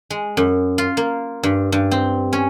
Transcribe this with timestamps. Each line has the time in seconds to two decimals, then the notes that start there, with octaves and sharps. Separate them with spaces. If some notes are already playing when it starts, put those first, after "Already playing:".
0.10 G#3
0.37 F#2
0.78 F4
0.97 A#3
1.43 G2
1.72 G2
1.91 C4
2.33 C#4